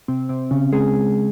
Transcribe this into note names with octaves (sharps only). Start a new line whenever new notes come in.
C3 C4
C3 C4
C#3 C#4
G#3 G#4